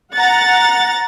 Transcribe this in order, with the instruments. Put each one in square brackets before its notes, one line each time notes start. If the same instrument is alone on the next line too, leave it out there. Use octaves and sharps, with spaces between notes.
[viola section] F#5 [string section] A#5 A6